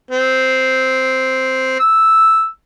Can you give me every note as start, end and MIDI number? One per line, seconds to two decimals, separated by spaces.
0.11 1.75 60
1.79 2.47 88